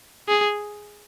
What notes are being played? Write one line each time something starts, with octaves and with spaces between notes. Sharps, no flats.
G#4